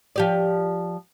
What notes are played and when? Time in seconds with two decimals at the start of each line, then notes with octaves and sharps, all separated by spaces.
0.16 F3 G4 D5